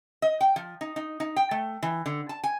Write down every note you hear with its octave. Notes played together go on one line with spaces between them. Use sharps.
D#5
G5
F3
D#4
D#4
D#4
G5
A3
E3
D3
A5
G#5